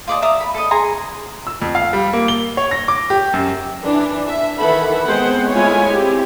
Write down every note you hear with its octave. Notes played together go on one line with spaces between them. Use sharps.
F4 D5 D#5 A5
D5 E5 A#5 D#6
B5
A4 D#5
G#4 G#5 A#5 C6
E6
F2
F5
G3
A#3
G7
C#5
A#6
D6
G4
F#2
E3 D4
E5
D#3 E3 A4 E5 F#5 B5
G#3 B3 C4 C5 F#5 G5
G#3 A3 E4 F4 C#5 G#5
C4 E4 G4